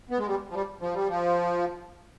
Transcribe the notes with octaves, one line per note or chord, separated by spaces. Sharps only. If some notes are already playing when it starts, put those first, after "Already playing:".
B3
G#3
G3
F3
G3
F3
G3
F3